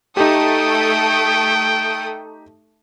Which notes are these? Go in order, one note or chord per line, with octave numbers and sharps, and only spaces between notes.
A3 D#4 G4 A4 G5 D#6